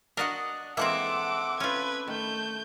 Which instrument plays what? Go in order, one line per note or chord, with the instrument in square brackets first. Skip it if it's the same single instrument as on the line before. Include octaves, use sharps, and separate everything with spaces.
[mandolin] D4 D#5 F#5 [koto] F#4 A#4
[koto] E3 G#3 A#3 [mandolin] C4 A4 E5 [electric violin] F#5 D6
[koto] C#4 F4 [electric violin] B4 G#6
[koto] D#3 [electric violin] A3 G6